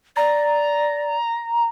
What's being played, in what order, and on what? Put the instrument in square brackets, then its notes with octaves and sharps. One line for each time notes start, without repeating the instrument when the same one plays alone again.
[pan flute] D5 [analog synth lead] A#5